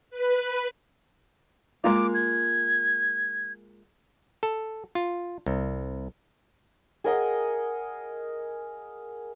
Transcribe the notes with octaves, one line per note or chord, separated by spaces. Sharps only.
B4
G#3 A#3 F4 D6
G#6
A4
F4
C2
G#4 A#4 D#5 F#5